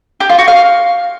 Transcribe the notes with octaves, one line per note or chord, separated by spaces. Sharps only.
G4
F4
F#4
F5